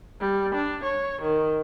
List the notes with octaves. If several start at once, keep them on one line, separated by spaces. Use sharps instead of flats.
G3
D4
C#5
D#3